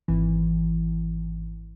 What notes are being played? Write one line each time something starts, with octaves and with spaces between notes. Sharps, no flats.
G#1 E3